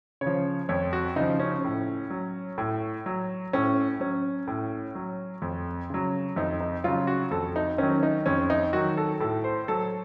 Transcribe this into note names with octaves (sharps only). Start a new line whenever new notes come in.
C#3 C#5
F3
F2 C#5
F#4
C#3 F3 D#4
C#4
A2
F#3
A2
F#3
A2 C#4
F#3 C#4
A2
F#3
F2
C#3 F#3
F2 D#4
D#4
C#3 F#3 F4
F#4
F2 A4
D#4
D#3 F#3 C#4
D#4
F2 C#4
D#4
D#3 F#3 F#4
A4
A2 A4
C5
F#3 A4